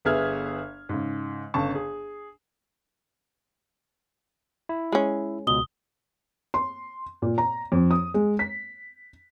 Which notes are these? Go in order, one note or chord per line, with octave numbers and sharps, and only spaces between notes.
G1 B3 G#4 E5 F6 G#6
G#2 C#3
G1 C#3 A5 C#6
G#4
E4
G#3 C#4
C#2 B2 D#6 G7
C6
A#2
A#5
F2
D#6
G#3
B6